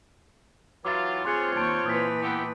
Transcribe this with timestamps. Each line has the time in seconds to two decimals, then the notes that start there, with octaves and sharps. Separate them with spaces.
0.85 E3 F#3 F4 D6 A6
1.25 C4 F4 G#4 C#5 C6 F#6 C#7
1.57 D#2 A5 C#6 G6 D7
1.86 A#2 E3 B4 D#6 B6
2.22 B3 E4 G4